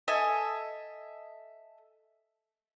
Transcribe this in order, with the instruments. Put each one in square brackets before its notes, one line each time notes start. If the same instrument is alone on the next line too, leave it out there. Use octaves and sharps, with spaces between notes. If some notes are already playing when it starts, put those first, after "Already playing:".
[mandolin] A4 D#5 E5 G#5